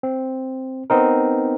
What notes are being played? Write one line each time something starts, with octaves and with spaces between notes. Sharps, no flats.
C4
B3 C4 D#4 A#4